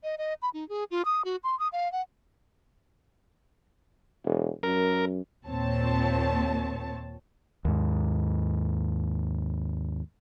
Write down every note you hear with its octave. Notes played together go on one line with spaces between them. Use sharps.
D#5
D#5
B5
D#4
G#4
F4
D#6
F#4
C6
D#6
F5
F#5
E1
F#2 A#4
D#2 A#2 C4 C#5 A5
D#2 G#2